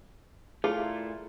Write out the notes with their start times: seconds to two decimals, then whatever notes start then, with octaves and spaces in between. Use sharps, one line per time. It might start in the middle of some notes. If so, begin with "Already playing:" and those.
0.64 A#2 A3 E4 F4 G#4